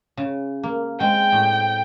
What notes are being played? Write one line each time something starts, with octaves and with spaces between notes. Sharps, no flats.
C#3
A#3
G#3 C4 G5
A2